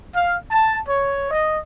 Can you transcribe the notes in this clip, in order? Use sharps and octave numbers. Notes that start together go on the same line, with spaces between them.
F5
A5
C#5
D#5